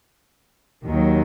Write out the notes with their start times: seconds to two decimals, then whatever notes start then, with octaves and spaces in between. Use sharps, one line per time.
0.84 D#2 D#3 F#3